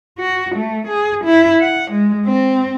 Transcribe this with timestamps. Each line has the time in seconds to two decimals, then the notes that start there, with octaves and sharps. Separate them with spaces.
0.19 F#4
0.56 A3
0.88 G#4
1.25 E4
1.62 F#5
1.91 G#3
2.26 C4